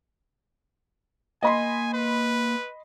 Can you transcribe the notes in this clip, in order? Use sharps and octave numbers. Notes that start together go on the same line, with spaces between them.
A#3 D#5 G#5 B5 C6
B4